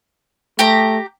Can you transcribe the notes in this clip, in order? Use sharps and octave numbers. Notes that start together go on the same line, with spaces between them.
A3 G4 A#5